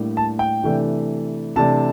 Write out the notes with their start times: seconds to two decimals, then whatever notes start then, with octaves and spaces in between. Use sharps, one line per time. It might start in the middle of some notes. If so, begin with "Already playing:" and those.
Already playing: A2 G3 A#3 D4
0.17 A5
0.39 G5
0.63 C3 E3 A3 D4
1.56 C3 E3 A3 D4 A5